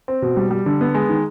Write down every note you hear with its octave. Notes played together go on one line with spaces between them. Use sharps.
C4
B2
G3
G3
D3
B3
G#3
D#3